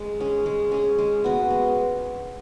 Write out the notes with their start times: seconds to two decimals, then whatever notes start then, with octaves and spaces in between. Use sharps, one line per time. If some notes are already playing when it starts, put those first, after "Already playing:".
Already playing: G#3
0.20 C#4 G#4
0.46 G#3
0.72 C#4 G#4
0.98 G#3
1.24 B3 F#4
1.51 G#3